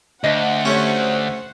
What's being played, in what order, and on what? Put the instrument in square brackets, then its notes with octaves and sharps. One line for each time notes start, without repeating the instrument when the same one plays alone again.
[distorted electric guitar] D2 [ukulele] D4 D#5 [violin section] C5 F#5
[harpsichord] A3 C#4 [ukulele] G4 C#5